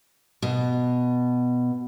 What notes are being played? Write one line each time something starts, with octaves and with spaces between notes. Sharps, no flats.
B2